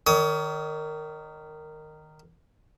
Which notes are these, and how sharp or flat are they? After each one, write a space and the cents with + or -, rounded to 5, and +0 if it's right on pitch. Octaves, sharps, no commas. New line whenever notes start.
D#3 -15 C#5 +30 D#6 +30